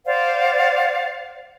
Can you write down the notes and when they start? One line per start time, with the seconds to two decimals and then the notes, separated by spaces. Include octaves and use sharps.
0.06 C5 D5 F5 F#5